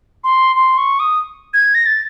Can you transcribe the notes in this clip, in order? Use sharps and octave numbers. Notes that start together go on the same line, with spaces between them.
C6
C6
C#6
D#6
G#6
A#6
A6